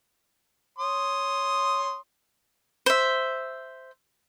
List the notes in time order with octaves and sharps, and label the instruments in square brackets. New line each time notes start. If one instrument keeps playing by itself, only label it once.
[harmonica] C#5 C6 D#6
[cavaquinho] C5 E5